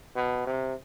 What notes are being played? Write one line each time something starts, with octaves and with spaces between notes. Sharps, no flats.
B2
C3